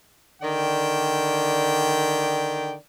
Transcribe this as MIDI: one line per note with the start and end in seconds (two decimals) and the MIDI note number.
0.42 2.75 50
0.42 2.75 51
0.42 2.75 74
0.42 2.75 79